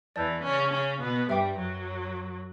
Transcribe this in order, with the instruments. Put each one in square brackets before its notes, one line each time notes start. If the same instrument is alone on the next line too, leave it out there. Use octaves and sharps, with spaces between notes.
[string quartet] E2 E3 [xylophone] D5 A5 E6 G6
[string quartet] C#3 C#4
C#3 C#4
B2 B3
[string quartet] G2 G3 [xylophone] B4 E5 G5 D6
[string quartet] F#2 F#3